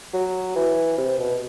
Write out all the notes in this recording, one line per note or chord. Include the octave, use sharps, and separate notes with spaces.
F#3
E3
C3
B2